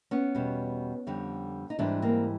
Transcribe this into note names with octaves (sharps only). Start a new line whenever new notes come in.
B3 C#4
E2 B2 G3
F2 D3 G3
D#4
G#2 E3 G3 C4 D4
A#3 C4